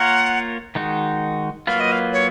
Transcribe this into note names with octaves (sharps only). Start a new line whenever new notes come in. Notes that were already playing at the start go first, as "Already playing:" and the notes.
Already playing: A#3 F4 A#4 C#5 F#5
D#3 G#3 D#4 F#4
F#3 A#3 F4 B4 F5
D#5
F5
C#5